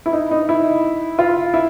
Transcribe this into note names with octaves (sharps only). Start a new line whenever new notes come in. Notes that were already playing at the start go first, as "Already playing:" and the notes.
E4
D#4
D#4
E4
F4
E4